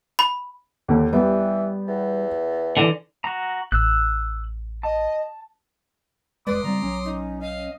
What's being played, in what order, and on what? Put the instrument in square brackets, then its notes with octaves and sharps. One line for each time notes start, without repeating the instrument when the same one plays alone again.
[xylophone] B5
[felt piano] D#2 D3
[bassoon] E3 [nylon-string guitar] G3 [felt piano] B3 G4
[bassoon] E2
[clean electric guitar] D3 E3
[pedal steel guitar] F#4 A#5
[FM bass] A1 [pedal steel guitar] E6 F#6
[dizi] D#5 [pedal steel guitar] A5
[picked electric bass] F1 G#3 [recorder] B4 [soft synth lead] D5 [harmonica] C6 D6 D#6
[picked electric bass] C#3 G3 C4 [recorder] A#5
[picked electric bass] B1 F#3 [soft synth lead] C#4
[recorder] D#4
[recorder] D#5 [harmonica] F5